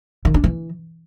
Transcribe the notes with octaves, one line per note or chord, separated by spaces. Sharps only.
D#3
D4
E3